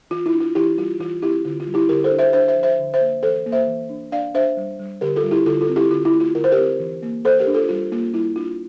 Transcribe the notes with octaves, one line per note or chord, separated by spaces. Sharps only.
E3 F4
E4
D4
F4
E3 E4 G4
G3 F4
E3 F4
C4 E4 G4
D3 F4
F4
G3
E4 G4
D3 G4 A#4
A4 C5
D4
C5 E5
D4 C5 E5
C5 E5
F3
C5 E5
D3
C5 E5
A#3
E3 A4 C5
A#3
C5 E5
E3
D4
D4 D5 F5
D4 C5 E5
G3
G3
D3 G4 A#4
F4 A4
G3
E4 G4
D3 F4 A4
F4 A4
C4
E4 G4
D3 F4
E4
A3
F4
D3 A#4
C5
G4 A#4
C4
E3
A#3
E3 A4 C5
G4 A#4
D4
F4 A4
G3 F4
A#3 F4
G3 E4
D4 F4